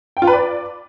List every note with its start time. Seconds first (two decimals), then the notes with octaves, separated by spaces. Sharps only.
0.17 G5
0.22 F4
0.27 B4
0.33 D5